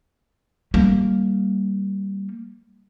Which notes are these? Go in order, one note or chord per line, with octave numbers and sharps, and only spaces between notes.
G3 A#3